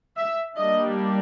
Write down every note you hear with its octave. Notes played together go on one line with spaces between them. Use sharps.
E5
G3 A#3 D4 D#5